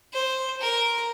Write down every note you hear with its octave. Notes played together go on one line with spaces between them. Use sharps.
C5
A#4